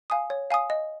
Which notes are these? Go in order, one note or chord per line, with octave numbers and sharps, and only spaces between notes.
F5 G#5 D#6
C#5
F5 G#5 D#6
D#5